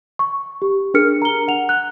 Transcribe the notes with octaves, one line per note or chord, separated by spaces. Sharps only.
C#6
G4
D4 G#4 A#4 F6 C#7
A#5 G7
F#5 F7
F#6